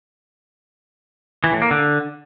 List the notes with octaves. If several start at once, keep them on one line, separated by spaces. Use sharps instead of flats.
E3
A2
A#3
D3